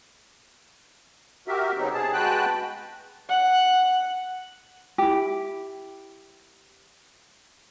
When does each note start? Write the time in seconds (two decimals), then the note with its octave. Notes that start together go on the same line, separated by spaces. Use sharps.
1.48 F#4 G4 A#4 E5
1.78 C#3 F#3 B3 C4 D#4
1.93 C3 G#4 A5
2.13 G#3 F#4 B4 G5 A5 F#6
3.29 F#5
4.98 E4 G4